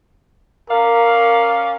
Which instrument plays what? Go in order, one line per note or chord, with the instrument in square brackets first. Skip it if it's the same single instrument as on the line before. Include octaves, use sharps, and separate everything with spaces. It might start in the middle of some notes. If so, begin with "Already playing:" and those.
[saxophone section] C#4 D5 F5 [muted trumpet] A#4